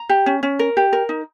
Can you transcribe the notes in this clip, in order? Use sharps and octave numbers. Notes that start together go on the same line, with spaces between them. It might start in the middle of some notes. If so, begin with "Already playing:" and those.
Already playing: A#5
G4
C#4
C#4
A#4
G4
A#4
D#4